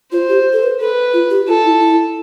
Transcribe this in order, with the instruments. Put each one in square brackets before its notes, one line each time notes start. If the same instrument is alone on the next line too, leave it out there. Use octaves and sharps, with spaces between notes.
[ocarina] F4 [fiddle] C5
[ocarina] G4
A4
B4
[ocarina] A4 [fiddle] B4
[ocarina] F4
G4
[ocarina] F4 [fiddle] A4
[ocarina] E4
E4